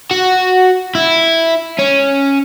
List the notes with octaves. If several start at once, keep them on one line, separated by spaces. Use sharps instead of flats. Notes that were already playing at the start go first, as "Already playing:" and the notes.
F#4
E4
C#4